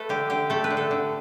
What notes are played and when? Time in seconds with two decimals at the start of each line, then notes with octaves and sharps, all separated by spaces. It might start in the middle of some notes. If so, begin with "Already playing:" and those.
Already playing: A3 A4 B4
0.09 D3 G4
0.30 D3 G4
0.50 A3 A4
0.64 B4
0.70 D3
0.77 A4
0.91 D3